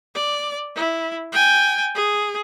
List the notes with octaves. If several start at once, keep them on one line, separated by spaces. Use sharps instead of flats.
D5
E4
G5 G#5
G#4